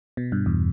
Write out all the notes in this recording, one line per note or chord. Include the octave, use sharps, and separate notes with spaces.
B2
G2
E2